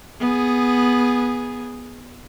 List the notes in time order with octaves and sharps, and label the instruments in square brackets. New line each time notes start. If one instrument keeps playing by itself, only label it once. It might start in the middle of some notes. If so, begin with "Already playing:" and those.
[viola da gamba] B3 G#4